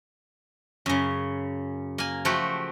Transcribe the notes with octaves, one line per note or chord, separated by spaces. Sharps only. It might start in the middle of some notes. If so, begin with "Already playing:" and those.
F#2 C#3
A#3 G#5
F3 A3 F#4 G4